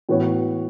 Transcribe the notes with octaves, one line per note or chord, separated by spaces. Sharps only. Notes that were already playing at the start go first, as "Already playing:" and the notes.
A2 E3 B3 F#4 C#5